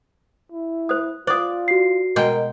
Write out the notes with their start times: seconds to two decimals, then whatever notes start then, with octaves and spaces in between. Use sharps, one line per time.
0.52 E4
0.89 C5 D#6
1.27 F4 C5 D5 D#6
1.68 F#4 C7
2.16 B2 G#3 A#4 G5